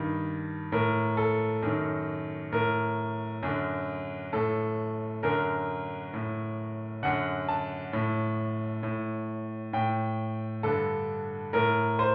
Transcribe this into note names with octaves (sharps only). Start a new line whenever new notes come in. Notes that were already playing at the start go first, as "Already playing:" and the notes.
Already playing: G2 D#3
A2 A#4
A4
F#2 D#3
A2 A#4
F#2 D3
A2 A4
F#2 D3 A#4
A2
F#2 D3 F#5
A5
A2
A2
A2 G5
G2 D3 A4
A2 A#4
C5